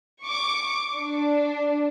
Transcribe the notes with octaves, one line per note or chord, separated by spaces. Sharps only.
C#6 D6
D4